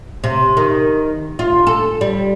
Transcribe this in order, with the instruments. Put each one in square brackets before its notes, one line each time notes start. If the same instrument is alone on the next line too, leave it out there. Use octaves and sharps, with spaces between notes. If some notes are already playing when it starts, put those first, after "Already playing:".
[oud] C3
D#3
F4
A4
G3